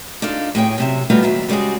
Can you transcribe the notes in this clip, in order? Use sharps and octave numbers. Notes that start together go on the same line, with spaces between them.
D4 D#4 F4 A4 F5
A2 G#4 C#5 G5
F#2 C3 E5
G3 A3 B3 D#4 F4 F#4
D#2 F#3 E5
C#3 G3 G#3 F#4 G#4